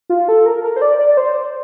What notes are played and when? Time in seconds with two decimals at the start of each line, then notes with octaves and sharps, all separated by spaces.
0.09 F4
0.28 A4
0.46 A#4
0.64 A#4
0.76 C5
0.82 D5
0.99 D5
1.17 C5